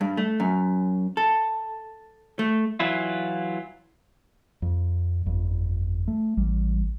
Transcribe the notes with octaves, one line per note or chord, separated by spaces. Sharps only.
G2
A3
F#2
A4
A3
E3 F#3 E4 F4
F2
G1 F2
A3
A1 G3